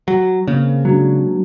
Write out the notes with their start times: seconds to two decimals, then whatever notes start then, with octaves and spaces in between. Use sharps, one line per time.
0.08 F#3
0.47 C#3 A#3 C4
0.85 F#3 G#3 D4